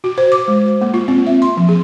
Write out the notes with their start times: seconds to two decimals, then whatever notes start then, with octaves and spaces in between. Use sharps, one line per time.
0.04 F#4
0.18 C5
0.32 D6
0.48 G#3
0.66 C5
0.81 A#3
0.94 F4
1.08 C4
1.27 E5
1.42 C6
1.57 F3
1.69 G#4